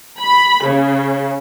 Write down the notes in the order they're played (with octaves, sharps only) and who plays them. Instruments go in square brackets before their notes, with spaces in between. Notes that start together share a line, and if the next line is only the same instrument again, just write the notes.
[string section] B5
C#3